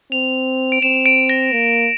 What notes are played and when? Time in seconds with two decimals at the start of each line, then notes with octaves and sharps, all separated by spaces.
0.12 C4 F7
0.72 D7
0.82 C4 E7
1.06 D7
1.30 A#6
1.52 A#3